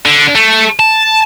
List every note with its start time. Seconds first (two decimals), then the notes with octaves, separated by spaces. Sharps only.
0.05 D3
0.35 A3
0.79 A5